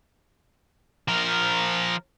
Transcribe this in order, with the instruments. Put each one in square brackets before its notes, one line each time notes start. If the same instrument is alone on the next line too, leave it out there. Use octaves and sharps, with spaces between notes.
[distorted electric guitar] F3 A#4